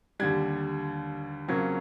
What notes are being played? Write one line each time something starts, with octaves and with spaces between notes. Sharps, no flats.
D#2 D3 G3 G#6
F2 C#3 F#3 A#3 C#4 G#6